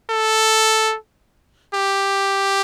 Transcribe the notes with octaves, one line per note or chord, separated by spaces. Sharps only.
A4
G4